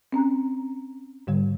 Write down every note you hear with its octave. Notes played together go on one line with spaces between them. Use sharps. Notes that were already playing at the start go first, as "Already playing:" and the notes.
C4 C#4 A#5
G#2 D3 G3